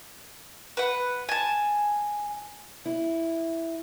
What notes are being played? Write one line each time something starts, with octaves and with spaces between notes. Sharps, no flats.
B4 F#5
G#5 A5
E4